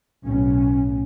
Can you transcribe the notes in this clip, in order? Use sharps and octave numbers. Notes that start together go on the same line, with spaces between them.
B1 A2 C#4